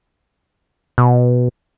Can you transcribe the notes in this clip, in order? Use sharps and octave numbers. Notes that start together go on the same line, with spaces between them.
B2